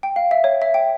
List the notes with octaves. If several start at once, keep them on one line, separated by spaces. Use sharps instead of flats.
G5
F5
E5
C#5
E5
G5